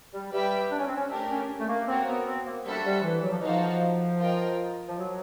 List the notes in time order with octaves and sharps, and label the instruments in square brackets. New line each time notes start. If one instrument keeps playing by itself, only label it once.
[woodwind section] G3
[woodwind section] G3 [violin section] G4 B4 E5 G5
[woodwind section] D4
C#4
C4
C#4
[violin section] A3 D4 G4 A#4
[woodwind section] C#4
A3
A#3
[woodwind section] C4 [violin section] F#4 A#4 C#5
[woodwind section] B3
C4
A#3
[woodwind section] G3 [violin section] D4 F#4 A4 C5 E5
[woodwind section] G3
E3
F#3
F3
E3
[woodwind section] F3 [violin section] D#4 F#4 A4 C5 F5
[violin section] F4 A#4 D#5 G5
[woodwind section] F3
F#3